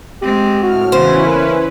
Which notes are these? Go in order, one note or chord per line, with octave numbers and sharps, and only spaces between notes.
G#3 C4 G4
A2 F#4 F6
E2 C#3 C#4 E4 B4 C5
A#3